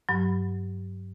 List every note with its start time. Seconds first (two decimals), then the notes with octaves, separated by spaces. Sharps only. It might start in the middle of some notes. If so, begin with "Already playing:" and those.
0.09 G2 F#3